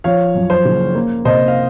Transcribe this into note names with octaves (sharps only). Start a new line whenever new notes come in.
F3 C#5 F5
F#2
C5
F#1
A#3
C3 C5 D#5
F5